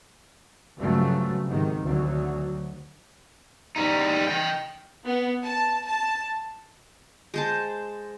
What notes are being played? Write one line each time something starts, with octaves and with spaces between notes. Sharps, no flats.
G2 C#3 F3 F#3 A3
G#2 C3 D#3
D2 F#3
G3 D#4
D#5 G5
B3
A5
A5
G#3 C5 A5